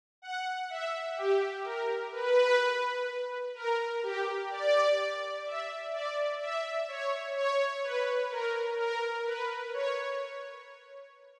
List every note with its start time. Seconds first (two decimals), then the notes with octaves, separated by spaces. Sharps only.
0.22 F#5
0.70 E5
1.17 G4
1.65 A#4
2.12 B4
3.54 A#4
4.03 G4
4.51 D5
5.46 E5
5.93 D5
6.40 E5
6.88 C#5
7.36 C#5
7.83 B4
8.31 A#4
8.79 A#4
9.26 B4
9.74 C#5